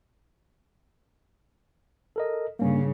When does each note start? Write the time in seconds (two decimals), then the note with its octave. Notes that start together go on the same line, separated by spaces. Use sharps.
2.16 A4 A#4 D#5
2.59 G2 C#3 A#3 C#4